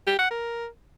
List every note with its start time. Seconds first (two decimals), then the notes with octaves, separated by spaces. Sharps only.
0.07 G4
0.19 F#5
0.31 A#4